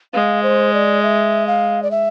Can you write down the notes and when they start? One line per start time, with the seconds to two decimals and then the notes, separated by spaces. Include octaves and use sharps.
0.14 G#3 F5
0.43 C5
0.73 D5
1.03 E5
1.47 F5
1.83 D5
1.91 E5